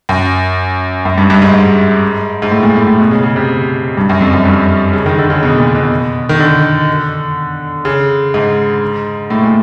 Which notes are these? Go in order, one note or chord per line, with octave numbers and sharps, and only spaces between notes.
F#2
F#2
G2
G2
G#2
G#2
G#2
A2
A#2
A2
A2
B2
C#3
C#3
C3
G2
F#2
F2
F#2
G2
C#3
D#3
D3
C#3
B2
A#2
B2
D#3
D3
C#3
G#2
A2
A#2